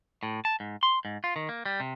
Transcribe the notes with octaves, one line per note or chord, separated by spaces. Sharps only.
A2
A5
G#2
C6
G#2
F4
D#3
A#3
G3
C3